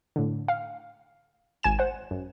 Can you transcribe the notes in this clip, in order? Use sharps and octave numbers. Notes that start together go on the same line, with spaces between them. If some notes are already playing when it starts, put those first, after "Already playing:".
A2 D3
F5
G#1 G#5 E7
C5 F#5
F#2